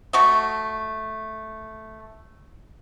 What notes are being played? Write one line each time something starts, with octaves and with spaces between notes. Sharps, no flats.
A3 F#4 D#5